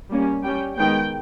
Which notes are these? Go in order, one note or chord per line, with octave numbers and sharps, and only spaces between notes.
G3 A#3 C#4
G3 C#4 G5
D#3 G#3 B3 G5